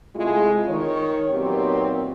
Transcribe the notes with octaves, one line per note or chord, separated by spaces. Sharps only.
C3 G#3 A3 E4 F4
D#3 C#5
A#2 D#3 F#3 B3 C4 G4